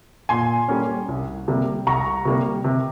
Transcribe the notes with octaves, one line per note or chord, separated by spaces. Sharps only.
A#2 G#5 C6
G3 A#3 C#4
C2
C3 G3 A#3
C2 A#5 C#6
C3 G3 A#3
C3